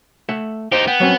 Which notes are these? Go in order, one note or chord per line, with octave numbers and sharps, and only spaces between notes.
A3 E5 F#5
D#4 G4 C5 D#5
B3 G5
F#3 C4 C#4